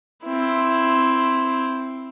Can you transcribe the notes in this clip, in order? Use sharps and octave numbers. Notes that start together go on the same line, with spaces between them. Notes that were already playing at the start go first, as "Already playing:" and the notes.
C4 E4